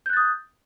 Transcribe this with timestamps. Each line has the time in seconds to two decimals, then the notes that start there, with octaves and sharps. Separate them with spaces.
0.06 G6
0.09 F#6
0.13 A6
0.17 D#6